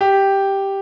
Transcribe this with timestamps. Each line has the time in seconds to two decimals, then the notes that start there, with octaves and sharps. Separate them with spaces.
0.01 G4